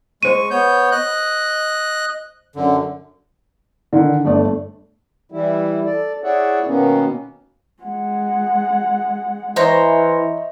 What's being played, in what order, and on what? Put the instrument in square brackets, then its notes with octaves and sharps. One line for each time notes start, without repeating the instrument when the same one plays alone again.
[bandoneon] G#3 C#6 [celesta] C5 D#7
[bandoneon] B3 C#5 G6
D#5 F#6
F#2 D3
[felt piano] D3 D#3
G1 A3 D5
[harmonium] E3 G3 E4
A4 D5
E4 G#4 C#5 D5 E5 F#5
B2 D#3 A#3 B3 C#4
[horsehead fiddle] G#3 F#5
[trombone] E3 [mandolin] C5 C#5 A#5 [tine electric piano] D#5 E5